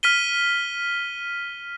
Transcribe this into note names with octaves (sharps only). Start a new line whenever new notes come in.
F6 B6 D#7 G7